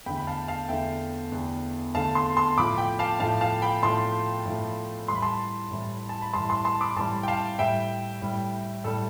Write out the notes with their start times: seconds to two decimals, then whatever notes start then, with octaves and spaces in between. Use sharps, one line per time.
0.06 E2 D3 A3 G5 B5
0.17 B5
0.27 F5 A5
0.48 F5 A5
0.69 E2 D3 A3 E5 G5
1.32 E2 D3 A3
1.95 E2 D3 A3 F5 A5
2.15 A5 C6
2.37 A5 C6
2.57 A2 F3 A3 B5 D6
2.78 G5 B5
2.99 F5 A5
3.20 A2 F3 A3 F5 A5
3.41 F5 A5
3.62 G5 B5
3.82 A2 F3 A3 A5 C6
4.46 A2 F3 A3
5.08 A2 E3 G3 C6
5.15 B5
5.22 A5 C6
5.71 A2 E3 G3
6.09 A5
6.21 B5
6.33 A2 E3 G3 A5 C6
6.49 A5 C6
6.65 A5 C6
6.81 B5 D6
6.96 A2 E3 G3 A5 C6
7.23 G5
7.28 F5 A5
7.59 A2 G3 E5 G5
8.22 A2 G3
8.84 A2 G3 A4